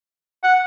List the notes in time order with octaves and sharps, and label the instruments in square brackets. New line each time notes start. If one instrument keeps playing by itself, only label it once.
[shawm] F#5